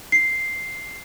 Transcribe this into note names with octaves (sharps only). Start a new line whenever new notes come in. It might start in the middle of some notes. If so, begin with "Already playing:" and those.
C7